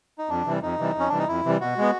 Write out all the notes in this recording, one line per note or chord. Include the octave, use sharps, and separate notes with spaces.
D#4
F2 D4
C3 E3 G3
F2 D#4
C3 E3 G3
F2
C#4
C3 E3 G3 D4
D#4
F2 E4
C3 E3 G3
B2 F#4
G#3 B3